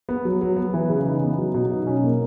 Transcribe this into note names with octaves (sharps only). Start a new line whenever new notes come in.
B3
F#3
F#3
B3
E3
C#3
D#4
B3
F#3
B2
D#4
C#4
A#3